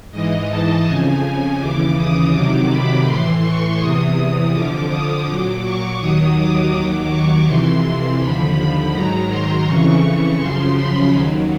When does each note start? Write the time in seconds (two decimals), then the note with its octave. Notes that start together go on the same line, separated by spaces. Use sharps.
0.12 G#2 E3 D#5
0.49 A5
0.85 F2 C#3 F3 G#5
1.59 D#2 C#3 E3 D6
1.96 D#6
2.32 F2 C3 D#3 F#3 D6
2.69 B5
3.05 A2 E3 C6
3.42 C#6
3.79 E2 C3 E3 D#6
4.52 F2 D3 F3 D6
4.89 D#6
5.26 A#2 F#3 D6
5.63 C#6
5.99 D#2 D#3 F#3 D#6
6.36 D6
6.72 D#2 D#3 F#3 D6
7.09 C#6
7.45 F2 C3 E3 C6
8.18 D#2 D3 F3 B5
8.93 G#2 D#3 F#3 A#5
9.29 C6
9.66 F2 C#3 E3 C#6
10.39 F#2 C#3 F3 C6
10.75 B5
11.12 D#2 D#3 F#3